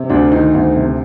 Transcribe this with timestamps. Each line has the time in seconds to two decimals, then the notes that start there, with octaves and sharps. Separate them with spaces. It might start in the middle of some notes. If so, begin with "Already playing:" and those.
Already playing: C3
0.10 D2 D4
0.32 D#3 D#4
0.54 D2
0.76 C3